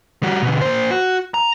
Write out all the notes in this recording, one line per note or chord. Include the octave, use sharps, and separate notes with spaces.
G3 F#4
B2 D3
A#3 C5
F#4
A#5